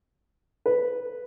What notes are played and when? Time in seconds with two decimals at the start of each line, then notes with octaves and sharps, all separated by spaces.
0.66 B4